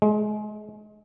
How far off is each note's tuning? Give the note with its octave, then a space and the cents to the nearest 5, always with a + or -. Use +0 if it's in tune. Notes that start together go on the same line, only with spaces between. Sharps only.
G#3 +30